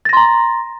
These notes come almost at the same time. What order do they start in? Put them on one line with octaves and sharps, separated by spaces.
A6 A#6 C6 A#5